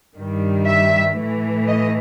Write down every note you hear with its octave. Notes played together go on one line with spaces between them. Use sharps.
G2 D#3 G3
E5
A2 E3 A3
D#5